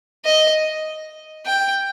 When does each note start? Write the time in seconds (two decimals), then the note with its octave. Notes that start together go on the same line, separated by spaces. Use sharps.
0.25 D#5
1.46 G5